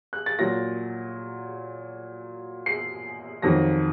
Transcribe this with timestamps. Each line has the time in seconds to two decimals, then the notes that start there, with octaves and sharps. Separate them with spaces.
0.13 F#6
0.26 A6
0.39 A#2 F#3 A#6
2.66 C7
3.42 F2 D#3 F#3 A#6